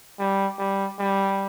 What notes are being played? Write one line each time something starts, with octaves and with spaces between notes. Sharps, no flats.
G3
G3
G3